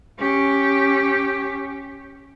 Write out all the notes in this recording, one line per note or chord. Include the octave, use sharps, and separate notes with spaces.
C#4 G4